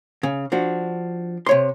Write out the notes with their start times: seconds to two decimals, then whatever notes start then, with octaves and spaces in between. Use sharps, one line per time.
0.23 C#3
0.52 F3 D4 F#4
1.46 C3 C#5 C6